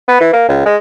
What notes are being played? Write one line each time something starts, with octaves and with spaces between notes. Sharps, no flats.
B3
E3
A#3
C#2
G#3